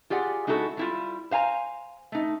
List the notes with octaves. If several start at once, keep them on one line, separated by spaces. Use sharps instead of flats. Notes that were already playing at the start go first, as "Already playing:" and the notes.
F4 G4 G#4 D5 F#5
G#3 D#4 E4 F#4 A4
G3 E4 F4
C5 F5 G#5 A#5
A3 D#4